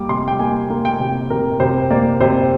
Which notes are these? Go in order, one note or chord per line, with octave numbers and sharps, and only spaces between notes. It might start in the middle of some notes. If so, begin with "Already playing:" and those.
Already playing: G3 A#3 D6
C3 C6
G5
A#3 G#5
A#3
G5
C3
C3 A#4
C3 C5
A#3 D5
C3 C5